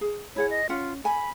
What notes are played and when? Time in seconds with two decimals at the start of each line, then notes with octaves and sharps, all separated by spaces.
0.01 G#4
0.36 E4 G#4 C#5 F#5
0.50 D#5
0.69 C#4 F4 F#5
1.04 A4 G#5 B5